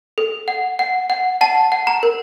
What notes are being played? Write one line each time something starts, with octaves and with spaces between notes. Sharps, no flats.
A4
F#5
F#5
F#5
F#5 A5
F#5
A#5
A#4